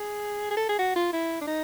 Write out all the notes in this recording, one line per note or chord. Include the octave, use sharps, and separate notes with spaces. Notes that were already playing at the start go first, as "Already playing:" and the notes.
Already playing: G#4
G#4
A4
G#4
F#4
F4
E4
D4
D#4